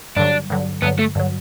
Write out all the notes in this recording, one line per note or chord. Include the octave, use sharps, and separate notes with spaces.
G2 D3 F#3 D4
G2 D3 F#3
G2 D3 F#3 B3
A3
G2 D3 F#3